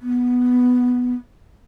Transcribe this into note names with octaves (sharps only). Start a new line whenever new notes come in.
B3